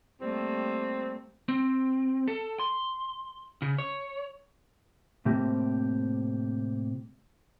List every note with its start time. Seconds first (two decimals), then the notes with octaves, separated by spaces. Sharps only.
0.21 G3 A3 A#3 C4
1.48 C4
2.28 A4
2.59 C6
3.62 C#3
3.78 C#5
5.25 A2 C3 A3 A#3 C4 G4